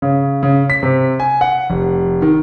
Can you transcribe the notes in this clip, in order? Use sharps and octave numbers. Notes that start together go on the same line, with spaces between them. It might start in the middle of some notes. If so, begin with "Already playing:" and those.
C#3
C#3
B6
C3
G#5
F#5
F1
D#3